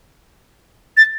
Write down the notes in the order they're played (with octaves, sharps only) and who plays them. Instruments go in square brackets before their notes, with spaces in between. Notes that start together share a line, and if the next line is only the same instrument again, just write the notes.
[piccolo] A6